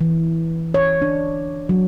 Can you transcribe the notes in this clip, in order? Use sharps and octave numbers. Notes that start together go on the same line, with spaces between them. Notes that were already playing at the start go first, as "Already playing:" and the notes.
E3
C#5
D4
F#3